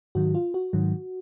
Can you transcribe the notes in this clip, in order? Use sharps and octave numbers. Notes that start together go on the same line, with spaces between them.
G#2 D#3 F#3 F#4
F4
F#4
G#2 D#3 F#3